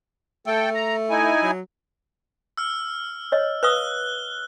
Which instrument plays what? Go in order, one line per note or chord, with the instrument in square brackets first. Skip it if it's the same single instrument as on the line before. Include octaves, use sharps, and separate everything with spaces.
[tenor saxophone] A3 [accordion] A4 G5
[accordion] A#5
D#4 E4 G#5
[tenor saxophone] F#3
[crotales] E6 F6
[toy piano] C#5 D#5
[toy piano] B4 F5 D#6 [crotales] F#6 G7